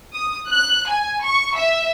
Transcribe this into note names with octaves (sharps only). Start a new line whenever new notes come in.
D#6
F#6
G#5
C#6
E5